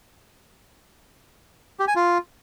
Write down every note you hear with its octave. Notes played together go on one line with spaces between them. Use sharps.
G4
G#5
F4